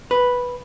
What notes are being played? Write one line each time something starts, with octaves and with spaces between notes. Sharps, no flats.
B4